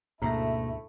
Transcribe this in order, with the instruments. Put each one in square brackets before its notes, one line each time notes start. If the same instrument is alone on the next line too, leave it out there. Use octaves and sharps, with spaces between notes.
[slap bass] D2 G#2 [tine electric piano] B2 A#3 A#6 [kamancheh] A3 E4 [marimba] A#5